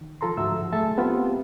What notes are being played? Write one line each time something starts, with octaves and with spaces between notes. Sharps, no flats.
D#3
F3 F4 A4 A#5 C6
D2 G#2 F3 F#4 E5 E6
F#3 A3 G#4 A4 E5 A5
B3 C4 F4 G4